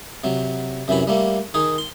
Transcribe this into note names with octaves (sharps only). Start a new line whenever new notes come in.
C3 F#3
F#2 C3 E3 F#3 B5
G3 A3 A#3
D#3 D#4 G#4
C6